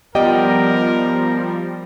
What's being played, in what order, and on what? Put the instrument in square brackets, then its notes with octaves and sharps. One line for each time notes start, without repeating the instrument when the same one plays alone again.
[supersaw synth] F3 G3 [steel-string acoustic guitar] B3 D5 G5 [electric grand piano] G4 D#5 [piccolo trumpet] A#4